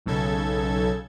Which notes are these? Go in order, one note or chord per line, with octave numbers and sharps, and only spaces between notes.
B1 C#3 A4 G#6